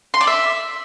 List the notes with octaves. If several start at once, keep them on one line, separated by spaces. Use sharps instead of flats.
C6
D5
E5